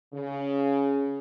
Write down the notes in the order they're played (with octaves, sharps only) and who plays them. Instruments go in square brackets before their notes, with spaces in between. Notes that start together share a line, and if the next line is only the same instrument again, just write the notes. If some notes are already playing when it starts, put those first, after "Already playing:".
[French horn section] C#3